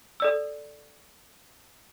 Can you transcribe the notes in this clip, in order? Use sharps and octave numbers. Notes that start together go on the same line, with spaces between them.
A4 D5 E6